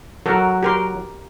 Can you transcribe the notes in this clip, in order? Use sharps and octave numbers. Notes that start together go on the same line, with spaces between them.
F#3 F#4 A4 A#4
G4 A#4 C6